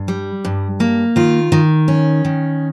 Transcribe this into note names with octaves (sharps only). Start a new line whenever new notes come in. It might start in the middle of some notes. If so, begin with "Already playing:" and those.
Already playing: G2
G3
G2
A#3
D#3 F4
D#3
C#4
D#3